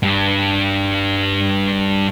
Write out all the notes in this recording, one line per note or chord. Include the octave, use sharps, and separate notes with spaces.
G2 G3